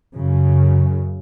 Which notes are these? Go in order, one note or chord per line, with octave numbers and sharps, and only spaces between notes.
F#2 C#3